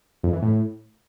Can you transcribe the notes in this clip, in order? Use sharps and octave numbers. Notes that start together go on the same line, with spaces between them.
F2
E3
A2